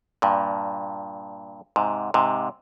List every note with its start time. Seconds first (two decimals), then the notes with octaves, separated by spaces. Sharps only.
0.22 G2 A#2
1.76 G#2 C3
2.14 G#2 C3